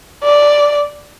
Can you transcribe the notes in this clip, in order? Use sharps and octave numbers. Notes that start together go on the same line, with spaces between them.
D5